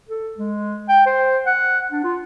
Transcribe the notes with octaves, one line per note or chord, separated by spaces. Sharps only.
A4
G#3
G5
C5
F#5
D4
F4